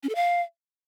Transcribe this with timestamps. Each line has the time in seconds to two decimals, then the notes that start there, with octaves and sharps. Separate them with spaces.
0.03 C#4
0.09 A4
0.15 F5